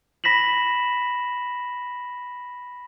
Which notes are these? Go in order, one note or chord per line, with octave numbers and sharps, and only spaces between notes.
B5 A#6 B6 E7 F#7